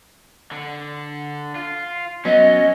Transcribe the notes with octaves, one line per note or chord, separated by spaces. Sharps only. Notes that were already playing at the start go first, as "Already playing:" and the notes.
D3
F4
F#3 B3 C#4 D#5